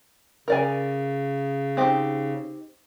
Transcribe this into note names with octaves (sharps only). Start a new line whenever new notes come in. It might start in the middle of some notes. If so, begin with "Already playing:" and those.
C#3 A#4 D5 G#5
C4 D#4 G4